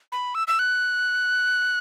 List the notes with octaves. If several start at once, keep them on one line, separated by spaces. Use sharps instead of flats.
B5
E6
E6
F#6